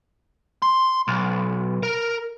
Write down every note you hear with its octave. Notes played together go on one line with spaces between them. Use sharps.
C6
B1
A#4